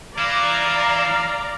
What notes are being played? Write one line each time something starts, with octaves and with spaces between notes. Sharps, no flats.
E3 E4 D5 F5 A#5